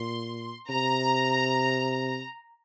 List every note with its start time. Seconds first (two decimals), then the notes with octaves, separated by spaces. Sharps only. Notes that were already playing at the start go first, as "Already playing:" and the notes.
Already playing: A#2 C6
0.70 C3 A#5